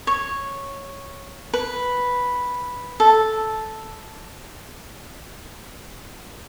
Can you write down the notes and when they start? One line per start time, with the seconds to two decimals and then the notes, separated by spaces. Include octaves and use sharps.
0.07 C#5
1.54 B4
3.00 A4